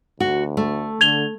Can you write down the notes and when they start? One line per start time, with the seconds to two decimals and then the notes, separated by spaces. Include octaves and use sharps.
0.20 D2 F#4
0.57 A3
1.01 D3 G#6 F7 G7